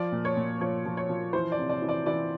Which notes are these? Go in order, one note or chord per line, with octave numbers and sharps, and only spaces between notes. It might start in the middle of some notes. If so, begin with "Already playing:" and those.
Already playing: F3 D5
A#2
C#5
A#2
F3 C#5
F3
C#5
F3
E3 C5
D5
C3
D5
E3
D5
E3 D5